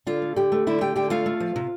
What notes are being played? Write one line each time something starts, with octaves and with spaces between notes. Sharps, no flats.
D3 F4 F5
A3
D3 G4 G5
A3
D3 E4 E5
A3 G4 G5
D3 G4 G5
A3 F4 F5
A3
F3
C3